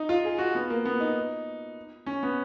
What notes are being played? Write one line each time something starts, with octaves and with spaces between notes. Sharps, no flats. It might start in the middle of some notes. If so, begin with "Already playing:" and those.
Already playing: D#4
F4
G#4
F#4
B3
A#3
B3
D#4
C#4
B3